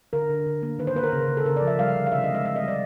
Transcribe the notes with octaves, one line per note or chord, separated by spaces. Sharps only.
D3 A#4
D3
D3
A#3
D#3 B4
C5
A#3 B4
A#4
C#3
C#3
A4
C#3 A#4
D5
F3
E5
G3 F5
D3
F5
C3 E5
D#5
G#3
E5
C3 E5
D#5
G3
D5